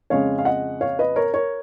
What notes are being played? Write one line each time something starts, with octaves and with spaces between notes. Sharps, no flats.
F2 C#3 G#3 C#5 F5
F5
D#5 F#5
C#5 F5
B4 D#5
A#4 C#5
A#4 C#5